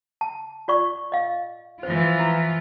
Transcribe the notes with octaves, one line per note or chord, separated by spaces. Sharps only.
A5
F4 D5 C#6
D#5 F5
E3 F3 F4 C5
E4